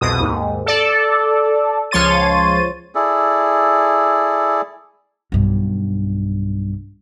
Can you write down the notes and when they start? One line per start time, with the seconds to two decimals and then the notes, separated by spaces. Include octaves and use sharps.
0.01 C2 F2 B2 D#6
0.20 D#2 G#2
0.66 A4 D5
1.91 C#2 F3 C#5 C6 A6 D#7
2.95 E4 G#4 A4 D5
5.32 B1 G2